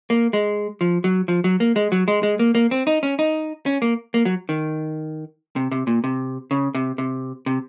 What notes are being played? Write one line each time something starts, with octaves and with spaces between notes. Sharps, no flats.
A#3
G#3
F3
F#3
F3
F#3
A#3
G#3
F#3
G#3
G#3
A#3
A#3
C4
D#4
C#4
D#4
C#4
A#3
A#3
F#3
D#3
C3
C3
A#2
C3
C#3
C3
C3
C3